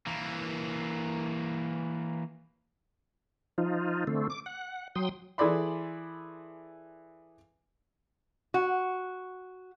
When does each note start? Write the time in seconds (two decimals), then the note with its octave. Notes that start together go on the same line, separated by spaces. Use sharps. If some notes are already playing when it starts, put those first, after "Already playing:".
0.07 E3 A#3
3.58 F3 D#4 F4
4.07 D3 A3 C4
4.30 D6
4.46 F#5
4.95 F#3 G5 C6 D#6
5.38 E3 G#4 A4 D5 B5 C6
8.54 F#4